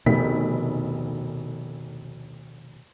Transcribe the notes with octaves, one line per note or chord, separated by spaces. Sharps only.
F1 D2 B2 D#3 B6